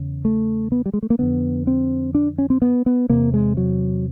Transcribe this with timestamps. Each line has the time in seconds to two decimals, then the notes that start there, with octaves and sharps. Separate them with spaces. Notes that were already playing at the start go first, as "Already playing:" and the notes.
Already playing: E2 C#3
0.25 A3
0.72 B3
0.86 G3
0.94 G#3
1.03 A3
1.10 A#3
1.19 F2 D3 B3
1.67 C4
2.15 D4
2.38 C#4
2.50 C4
2.62 B3
2.86 B3
3.10 E2 C3 A#3
3.34 G#3
3.57 F#3